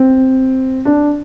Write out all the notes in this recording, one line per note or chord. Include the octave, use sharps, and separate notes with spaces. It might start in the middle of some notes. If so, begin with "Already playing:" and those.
Already playing: C4
D4